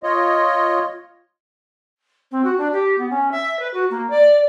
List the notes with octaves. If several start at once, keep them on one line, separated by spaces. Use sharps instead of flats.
F4 C#5 D#5
C4
F#4
D4
G4
B3
C#4
E5
B4
F#4
A#3
D5